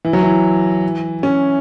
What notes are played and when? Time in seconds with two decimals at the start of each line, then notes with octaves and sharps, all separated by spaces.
0.05 E3
0.13 F#3
0.23 E3
1.23 C#4